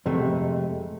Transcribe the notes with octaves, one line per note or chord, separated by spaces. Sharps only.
F2 C3 G#3 A3